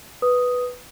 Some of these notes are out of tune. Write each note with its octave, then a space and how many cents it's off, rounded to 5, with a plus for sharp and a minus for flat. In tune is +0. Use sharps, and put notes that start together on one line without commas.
B4 +0 D#6 +0